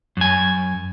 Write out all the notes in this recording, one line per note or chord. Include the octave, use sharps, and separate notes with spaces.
F#2 G#5